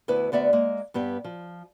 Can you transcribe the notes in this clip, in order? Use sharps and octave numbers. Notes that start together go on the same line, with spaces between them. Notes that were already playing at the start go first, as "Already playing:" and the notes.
D2 B3 E4 B4
D2 B3 D5 E5 F#5
G#3 A#3
G2 B3 G4
F3